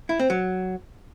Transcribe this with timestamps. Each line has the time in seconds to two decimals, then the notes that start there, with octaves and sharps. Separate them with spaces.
0.09 E4
0.19 C4
0.30 F#3